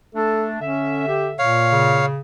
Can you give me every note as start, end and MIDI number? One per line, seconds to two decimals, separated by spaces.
0.15 0.61 57
0.15 0.61 62
0.15 0.46 69
0.61 1.46 50
0.61 1.03 61
0.61 1.46 76
1.08 1.29 67
1.39 2.16 46
1.39 2.06 73
1.39 2.06 77
1.72 2.20 49